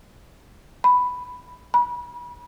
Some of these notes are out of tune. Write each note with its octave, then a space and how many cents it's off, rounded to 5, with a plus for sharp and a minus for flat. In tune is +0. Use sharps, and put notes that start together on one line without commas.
B5 +5
B5 -40